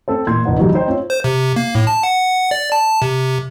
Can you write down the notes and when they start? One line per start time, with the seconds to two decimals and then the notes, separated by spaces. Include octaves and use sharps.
0.08 C4 A4 C5
0.27 E2 A#2 C6 G#6
0.45 E1 C#2 D4 D#4 B4 F#5
0.59 D3 E3 F#3 G3 D#4
0.74 D#4 C5 G5
0.88 C4 F4 C#5
1.10 C5
1.24 C3
1.56 A#3
1.75 A2
1.87 A5
2.03 F#5
2.51 D5
2.72 A5
3.02 C3